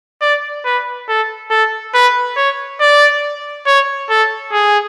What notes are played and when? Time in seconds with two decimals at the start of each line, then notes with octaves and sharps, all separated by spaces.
0.21 D5
0.65 B4
1.09 A4
1.51 A4
1.94 B4
2.37 C#5
2.81 D5
3.67 C#5
4.10 A4
4.52 G#4